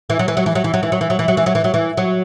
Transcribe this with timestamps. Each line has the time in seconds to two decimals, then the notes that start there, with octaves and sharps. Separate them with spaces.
0.10 E3
0.19 F#3
0.28 E3
0.37 F#3
0.46 E3
0.55 F#3
0.64 E3
0.74 F#3
0.83 E3
0.92 F#3
1.01 E3
1.10 F#3
1.19 E3
1.28 F#3
1.37 E3
1.46 F#3
1.55 E3
1.64 F#3
1.74 E3
1.97 F#3